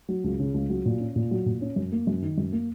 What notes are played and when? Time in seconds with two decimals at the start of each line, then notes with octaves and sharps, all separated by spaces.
0.09 F#3
0.24 C#2
0.39 C#3
0.54 C#2
0.70 F#3
0.86 A#2
1.00 C#4
1.16 A#2
1.31 F#3
1.46 A#2
1.61 C#4
1.76 F#2
1.92 A#3
2.07 F#2
2.22 D#3
2.38 F#2
2.52 A#3